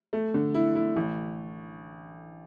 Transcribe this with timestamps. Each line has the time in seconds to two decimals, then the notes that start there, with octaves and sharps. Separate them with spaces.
0.13 A3
0.34 D3
0.54 E4
0.75 E4
0.96 A1